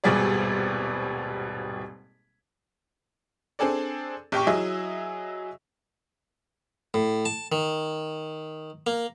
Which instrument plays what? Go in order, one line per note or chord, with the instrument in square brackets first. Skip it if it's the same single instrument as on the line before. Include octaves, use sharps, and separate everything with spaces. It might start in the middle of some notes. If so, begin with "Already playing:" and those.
[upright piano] D#1 G#1 B2 G3 G#4 D5
[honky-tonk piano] C4 D4 G#4 A4 D5
A#1 G4 G5 C#6
F#3 E4 G#4 D#5 E5
[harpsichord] A2
A5
D#3
A#3